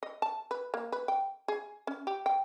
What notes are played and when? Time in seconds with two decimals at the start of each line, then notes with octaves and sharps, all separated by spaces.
0.03 D#5
0.22 A5
0.51 B4
0.74 A#3
0.92 B4
1.08 G5
1.48 G#4
1.87 C#4
2.07 G4
2.26 G5